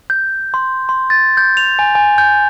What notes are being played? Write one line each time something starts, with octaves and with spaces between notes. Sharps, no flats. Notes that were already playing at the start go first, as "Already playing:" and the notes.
G6
C6
C6
A6
G6
F7
G#5
G#5
G6